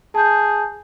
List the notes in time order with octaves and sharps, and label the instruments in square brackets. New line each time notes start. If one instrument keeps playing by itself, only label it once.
[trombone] G#4 [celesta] A5 G6